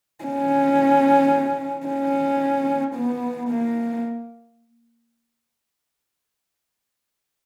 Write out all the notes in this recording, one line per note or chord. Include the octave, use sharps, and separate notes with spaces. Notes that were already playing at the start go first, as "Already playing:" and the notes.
C#4
C#4
B3
A#3